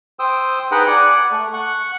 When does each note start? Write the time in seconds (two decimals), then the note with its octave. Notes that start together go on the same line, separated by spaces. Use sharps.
0.19 C5 G5 D#6 E6
0.72 D#4 G#4 B4 D#5 F#5 G5
0.88 D5 F#5 G#5
1.32 A3
1.53 F#5 C#6